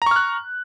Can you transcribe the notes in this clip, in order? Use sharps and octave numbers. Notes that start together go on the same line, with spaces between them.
A#5 C#6 F6 F#6